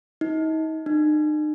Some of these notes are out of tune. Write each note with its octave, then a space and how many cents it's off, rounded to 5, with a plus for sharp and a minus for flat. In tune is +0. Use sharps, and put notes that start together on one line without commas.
D#4 +35
D#4 -45